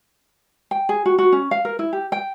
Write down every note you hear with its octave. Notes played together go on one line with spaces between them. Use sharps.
G5
G#4
F#4
F#4
C#4
F5
A#4
E4
G4
G5